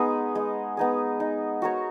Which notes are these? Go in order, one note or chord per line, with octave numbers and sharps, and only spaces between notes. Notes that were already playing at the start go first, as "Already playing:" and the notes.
Already playing: G#3 B3 D#4 G#4
G#3
B3 D#4 G#4
D#4
F#4 A#4 C#5